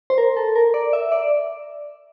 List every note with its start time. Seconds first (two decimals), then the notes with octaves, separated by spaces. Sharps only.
0.10 C5
0.18 A#4
0.37 A4
0.55 A#4
0.74 D5
0.93 E5
1.12 D5